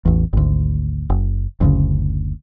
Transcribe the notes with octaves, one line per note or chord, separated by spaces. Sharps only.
A1 E2
G#1 D2
F#1
F#1 D2 C#3